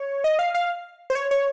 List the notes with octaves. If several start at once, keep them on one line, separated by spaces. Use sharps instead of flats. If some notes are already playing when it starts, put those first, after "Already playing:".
Already playing: C#5
D#5
F5
F5
C5
C#5
C#5